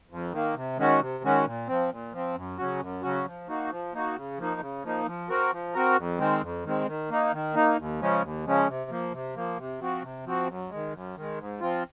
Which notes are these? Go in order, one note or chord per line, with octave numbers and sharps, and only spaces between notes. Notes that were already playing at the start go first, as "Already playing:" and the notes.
F2
D#3 A#3
C3
D#3 G#3 C#4 F#4
C3
D#3 G#3 C#4 F#4
A#2
F3 C4
A#2
F3 C4
F#2
C#3 F#3 C#4 F#4
F#2
C#3 F#3 C#4 F#4
F3
A#3 D#4 F#4
F3
A#3 D#4 F#4
C#3
F3 A#3 D#4
C#3
F3 A#3 D#4
F3
C4 F#4 A#4
F3
C4 F#4 A#4
F2
D#3 G#3 C4
F2
D#3 G#3 C4
D#3
A#3 D#4
D#3
A#3 D#4
D#2
C#3 F3 G#3 C#4
D#2
C#3 F3 G#3 C#4
C3
F3 A#3
C3
F3 A#3
C3
F3 C4 F#4
C3
F3 C4 F#4
F#2
D#3 G#3
F#2
D#3 G#3
G#2
F3 C4 F4